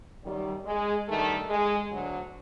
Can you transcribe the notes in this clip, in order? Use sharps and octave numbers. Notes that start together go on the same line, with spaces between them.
F#2 D#3 G3
G#3
G2 D#3 A3
G#3
D2 D3 F#3